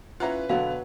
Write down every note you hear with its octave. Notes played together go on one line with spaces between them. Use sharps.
C#4 E4 F4 B4 F#5 A#5
B2 D3 F#3 B3 F5